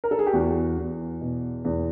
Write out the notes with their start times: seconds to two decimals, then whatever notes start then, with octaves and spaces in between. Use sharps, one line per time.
0.04 A#4
0.11 A4
0.19 G#4
0.26 G4
0.33 E2 F#4
0.77 E2
1.21 B2
1.65 E2